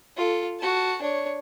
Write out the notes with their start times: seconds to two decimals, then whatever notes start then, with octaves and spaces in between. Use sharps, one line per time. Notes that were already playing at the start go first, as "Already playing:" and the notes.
0.17 F4 A4
0.59 F#4 A5
1.02 D4 C#5